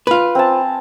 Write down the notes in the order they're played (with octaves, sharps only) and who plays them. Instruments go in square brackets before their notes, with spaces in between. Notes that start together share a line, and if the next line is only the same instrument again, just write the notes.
[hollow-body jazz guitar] F4 B4
[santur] C4 G#5 A5